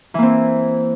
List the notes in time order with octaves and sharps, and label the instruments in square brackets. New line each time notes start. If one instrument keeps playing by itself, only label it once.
[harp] E3
A#3
C4